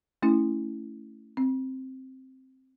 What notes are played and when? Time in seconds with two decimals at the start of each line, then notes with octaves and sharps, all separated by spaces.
0.23 A3 C#4 E4
1.37 C4